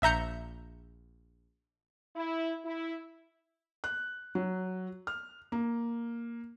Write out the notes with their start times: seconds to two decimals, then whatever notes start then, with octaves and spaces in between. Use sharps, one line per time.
0.02 A#1 E5 A#5 G6 C#7
2.16 E4
2.65 E4
3.84 F#6
4.35 F#3
5.07 F6
5.52 A#3